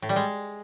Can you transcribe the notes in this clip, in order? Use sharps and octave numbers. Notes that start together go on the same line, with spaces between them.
A2
G3
G#3